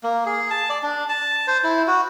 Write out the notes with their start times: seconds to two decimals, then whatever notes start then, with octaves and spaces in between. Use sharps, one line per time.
0.03 A#3
0.26 G#4
0.51 A5
0.70 D5
0.83 D4
1.09 A5
1.47 C5
1.64 E4
1.87 F#4